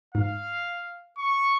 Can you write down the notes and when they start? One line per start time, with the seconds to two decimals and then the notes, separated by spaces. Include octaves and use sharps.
0.15 G#2 F5
1.18 C#6